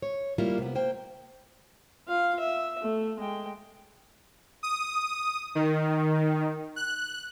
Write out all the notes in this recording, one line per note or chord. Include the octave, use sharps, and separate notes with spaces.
C#5
G3 A#3 E4 F4
C3 B3
A#3 C5 G5
F4 F5
E5
A3
G#3 G5
D#6
D#3
F#6